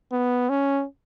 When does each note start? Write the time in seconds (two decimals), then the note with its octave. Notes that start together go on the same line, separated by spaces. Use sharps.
0.12 B3
0.50 C#4